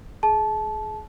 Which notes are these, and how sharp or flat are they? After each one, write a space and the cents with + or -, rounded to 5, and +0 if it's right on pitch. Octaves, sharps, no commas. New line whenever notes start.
G#4 +25 A5 -20